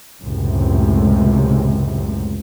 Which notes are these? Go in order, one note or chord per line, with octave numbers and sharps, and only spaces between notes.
C#2 F#2 A2 C3